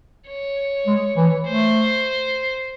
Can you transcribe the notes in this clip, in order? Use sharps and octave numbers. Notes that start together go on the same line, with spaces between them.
C#5
G#3
E3
A3 C5